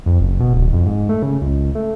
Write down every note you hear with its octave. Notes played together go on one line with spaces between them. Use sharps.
F2
F#1
B2
D1
F2
G#2
A3
C#3
C#2
A3